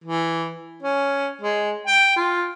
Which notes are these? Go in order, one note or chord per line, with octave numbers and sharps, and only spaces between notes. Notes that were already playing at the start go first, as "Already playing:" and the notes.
E3
C#4
G#3
G5
F4